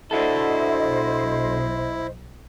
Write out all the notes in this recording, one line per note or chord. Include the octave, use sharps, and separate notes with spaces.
D4 E4 F#4 A4 C5 D#5 E5
B1